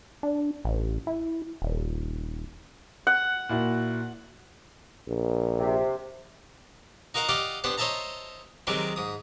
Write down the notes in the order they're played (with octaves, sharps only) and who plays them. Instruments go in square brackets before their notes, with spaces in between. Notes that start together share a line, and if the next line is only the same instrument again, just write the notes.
[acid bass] D4
A1
E4
D#1
[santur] F#5
[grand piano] A#2 E4 F#4
[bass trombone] A#1
[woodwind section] C3
[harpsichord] D#4 F#4 A#4 F5 F#5
G4 D5 D#5 F5 F#5
B3 D4 G4 C5 F#5
C5 C#5 D#5 E5 A5 A#5
D#3 F#3 G#3 C4 G4
G#2 D#6